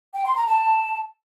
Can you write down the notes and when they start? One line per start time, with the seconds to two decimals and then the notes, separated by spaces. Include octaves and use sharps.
0.14 G5
0.25 C6
0.35 A#5
0.46 A5